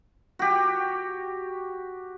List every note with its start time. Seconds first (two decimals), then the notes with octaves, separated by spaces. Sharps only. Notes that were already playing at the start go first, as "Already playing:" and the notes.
0.39 F#4 G4